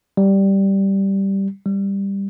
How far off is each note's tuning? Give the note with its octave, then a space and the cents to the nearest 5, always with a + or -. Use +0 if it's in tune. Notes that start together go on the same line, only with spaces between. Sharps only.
G3 -5
G3 +10